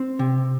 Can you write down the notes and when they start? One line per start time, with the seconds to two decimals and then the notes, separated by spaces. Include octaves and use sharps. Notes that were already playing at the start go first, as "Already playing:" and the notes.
Already playing: C4
0.19 C3